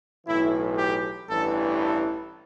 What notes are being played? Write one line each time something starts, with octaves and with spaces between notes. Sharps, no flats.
B1 A2 E3 E4
G4
A1 G2 E3 A4
A4